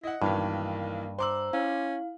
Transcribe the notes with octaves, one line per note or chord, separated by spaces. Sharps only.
E4 D#5 F#5
B1 G2 D#3 E3 A#3
C5 A#5 C6 D6 E6 F#7
C#4 E4 F5